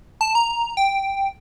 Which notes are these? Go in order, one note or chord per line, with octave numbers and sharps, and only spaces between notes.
A5
A#5
G5